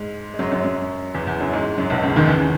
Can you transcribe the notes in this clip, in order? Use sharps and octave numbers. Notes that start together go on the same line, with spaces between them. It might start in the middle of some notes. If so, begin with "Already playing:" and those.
Already playing: G#2 G#3
G#3
F#2 F#3
F#2 F#3
F#2 F#3
E2 E3
E2 E3
F#2 F#3
G#2 G#3
F#2 F#3
B1 B2
C#2 C#3
D#2 D#3
E2 E3
C#3